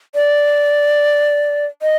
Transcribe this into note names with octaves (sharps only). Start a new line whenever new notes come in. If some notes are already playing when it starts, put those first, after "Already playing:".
D5
D#5